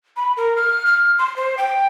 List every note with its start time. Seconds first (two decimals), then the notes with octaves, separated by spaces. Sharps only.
0.17 B5
0.37 A#4
0.56 F6
0.86 F6
1.19 C6
1.36 C5
1.58 G5